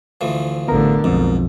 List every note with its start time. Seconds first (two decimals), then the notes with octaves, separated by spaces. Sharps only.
0.21 D2 E3 F3
0.68 A1 D3 B3 A#4 A#5
1.04 B1 F2 G#2